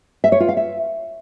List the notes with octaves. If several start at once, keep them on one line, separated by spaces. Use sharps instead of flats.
E5
C#5
F4
F5
E5